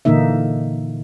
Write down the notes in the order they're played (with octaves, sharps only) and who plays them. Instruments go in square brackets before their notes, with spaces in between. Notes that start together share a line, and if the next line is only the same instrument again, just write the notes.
[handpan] A#2 D3 E3 A#3 D#4 E5